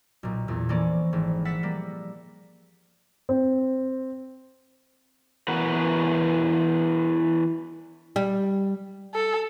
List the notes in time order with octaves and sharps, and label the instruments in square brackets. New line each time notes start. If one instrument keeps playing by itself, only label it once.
[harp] B1 A#2
E2 A#2
E3 F3 A#3 C#4 D5
G#1
E5 F#5 A6 B6
G3 A#3
[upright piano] C4
[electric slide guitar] E3 B3 F#4 A#4 F#5
[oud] G3
[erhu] A4